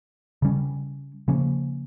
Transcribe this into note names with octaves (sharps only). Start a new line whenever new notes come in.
C#3 G3 C#4
C#3 F3 A#3 C#4